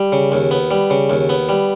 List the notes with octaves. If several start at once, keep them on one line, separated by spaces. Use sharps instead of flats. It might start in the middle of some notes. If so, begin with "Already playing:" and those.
Already playing: G3
C#3
D#2
B3
G3
C#3
D#2
B3
G3